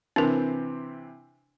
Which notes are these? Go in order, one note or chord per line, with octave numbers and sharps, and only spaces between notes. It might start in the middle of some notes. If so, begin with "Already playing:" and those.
C3 E3 C4 D4 A#4